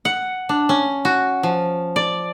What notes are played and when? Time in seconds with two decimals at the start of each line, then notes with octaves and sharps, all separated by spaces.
0.05 F#5
0.49 D4
0.69 C#4
1.05 F#4
1.43 F3
1.96 D5